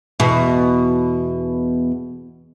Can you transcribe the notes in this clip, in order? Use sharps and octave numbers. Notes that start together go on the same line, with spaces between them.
E2 B2